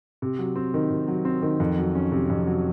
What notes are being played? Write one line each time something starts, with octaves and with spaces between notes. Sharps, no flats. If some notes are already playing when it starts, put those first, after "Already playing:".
C3
F#3
C4
D#3
C3
F#3
C4
D#3
F2
F#3
C#4
C3
F2
F#3